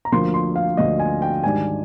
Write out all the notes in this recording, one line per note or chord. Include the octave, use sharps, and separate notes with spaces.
A#5
D2 D3 F3 A#3 C6
C6
F5
D2 D3 F3 A#3 D#5
G#5
G5
G#2 D#3 G3 D4 G#5